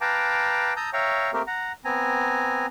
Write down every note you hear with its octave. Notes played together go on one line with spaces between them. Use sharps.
B4 F5 G5 A5 A#5 D6
A5 A#5 D#6 E6 G6
C#5 E5 F5 G5 A#5 C#6
A3 A#3 C4 G4 A#4
F#5 A#5
B3 C4 G#5 A#5